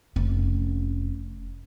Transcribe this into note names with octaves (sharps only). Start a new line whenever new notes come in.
F1 C#4